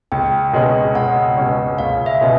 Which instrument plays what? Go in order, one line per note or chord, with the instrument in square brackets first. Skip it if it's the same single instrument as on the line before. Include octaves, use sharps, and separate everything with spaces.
[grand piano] C#2 [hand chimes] G5
[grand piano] B2 G#3 C#4
[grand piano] C#2 [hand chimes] F#5
[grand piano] B2 G#3 C#4
[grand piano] C#2 [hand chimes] F5
[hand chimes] E5
[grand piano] B2 G#3 C#4